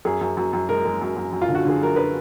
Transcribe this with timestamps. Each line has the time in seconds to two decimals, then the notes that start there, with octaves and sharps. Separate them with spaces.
0.05 F#2 G#4
0.21 F#2
0.37 F#2
0.53 F#2
0.69 G#3 A#4
0.85 G#3
1.02 F#2
1.17 F#2
1.33 F#2
1.42 F4
1.49 D3
1.55 F#4
1.65 D3 G#4
1.81 F#2 A#4
1.96 B4